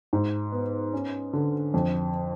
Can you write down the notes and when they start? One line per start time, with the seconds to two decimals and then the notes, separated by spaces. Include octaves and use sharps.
0.13 G#2
0.52 B3
0.93 C#4
1.33 D3
1.74 F2